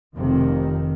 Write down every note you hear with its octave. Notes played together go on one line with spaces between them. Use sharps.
F1 F2 C3 D#3